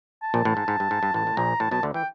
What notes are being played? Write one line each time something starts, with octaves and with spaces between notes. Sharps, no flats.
A5
A#1 A#2
A1 A2
G#2
G#2
G2
G#2
G2
A1 A2 A5
A2
A#1 A#2 A#5
A1 A2 A5
B1 B2 A5
D2 D3
E3 G5